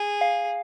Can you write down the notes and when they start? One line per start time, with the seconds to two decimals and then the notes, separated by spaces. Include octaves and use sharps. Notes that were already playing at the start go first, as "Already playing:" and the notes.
Already playing: G#4
0.21 F5